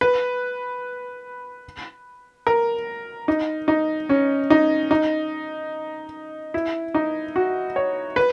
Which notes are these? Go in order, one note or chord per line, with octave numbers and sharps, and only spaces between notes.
B4
A#4
D#4
D#4
C#4
D#4
D#4
E4
D#4
F#4
C#5
B4